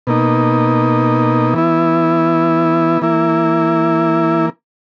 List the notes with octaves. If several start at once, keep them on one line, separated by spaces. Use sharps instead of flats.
B2 A#3 D#4
E3 B3 E4
E3 A#3 E4